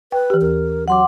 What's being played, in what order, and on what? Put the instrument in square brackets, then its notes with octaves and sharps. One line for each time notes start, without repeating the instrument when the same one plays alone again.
[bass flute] B4 [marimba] G5
[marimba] E3 G4
[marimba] D#2 [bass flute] A#4
[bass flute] F#3 [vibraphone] F#5 C6 D6